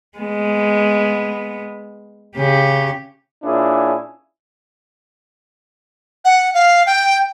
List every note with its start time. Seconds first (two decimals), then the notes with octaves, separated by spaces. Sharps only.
0.19 G#3 B3
2.37 C#3 G4
3.43 A#2 C#4 D4 E4 G#4
6.25 F#5
6.54 F5
6.87 G5